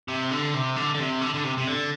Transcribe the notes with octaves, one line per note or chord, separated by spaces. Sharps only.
C3
D3
C3
D3
D3
C3
D3
D3
C3
C3
D3